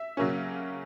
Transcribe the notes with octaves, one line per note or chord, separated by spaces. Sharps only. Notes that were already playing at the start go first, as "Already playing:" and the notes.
Already playing: E5
C#3 F#3 A#3 C#4